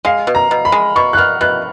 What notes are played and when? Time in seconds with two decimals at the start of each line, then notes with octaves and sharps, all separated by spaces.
0.05 G#3 F5
0.27 B2
0.35 A#5
0.51 B2
0.65 B5
0.72 G#3
0.96 B2 C#6
1.13 F#6
1.17 B2 F6
1.41 B2 F#6